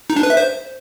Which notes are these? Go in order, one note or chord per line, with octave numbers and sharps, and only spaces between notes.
D#4
D4
B4
E5
C5